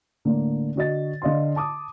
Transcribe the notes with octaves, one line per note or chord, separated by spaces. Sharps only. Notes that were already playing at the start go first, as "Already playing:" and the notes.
A2 D3 A#3
D3 F#4 D#5 A6
D3 D#5 F5 C6
A5 D6 D#6